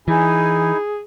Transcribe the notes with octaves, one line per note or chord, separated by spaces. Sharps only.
E3 D#4 E4 G#4 G#5